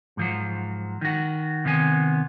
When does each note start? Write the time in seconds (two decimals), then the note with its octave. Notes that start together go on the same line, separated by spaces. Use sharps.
0.17 G#2 F3 F#3
1.01 D#3 F#4
1.65 C3 D#3 B3 G#5